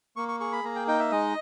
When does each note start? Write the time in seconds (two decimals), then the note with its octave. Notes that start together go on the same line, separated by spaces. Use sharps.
0.16 A#3 C#6
0.28 C#6
0.40 G#4 C#6
0.52 B5
0.64 A#3 A#5
0.76 G5
0.88 D#4 G5
0.99 E5
1.11 G#3 D#5